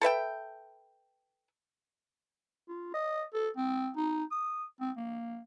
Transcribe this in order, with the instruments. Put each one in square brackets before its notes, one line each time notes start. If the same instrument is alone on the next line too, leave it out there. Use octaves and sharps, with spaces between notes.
[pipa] A4 B4 E5 G5
[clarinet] F4
D#5
A4
C4
D#4
D#6
C4
A#3